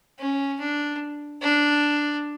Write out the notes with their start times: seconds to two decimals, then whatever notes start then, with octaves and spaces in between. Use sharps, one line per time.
0.19 C#4
0.60 D4
1.42 D4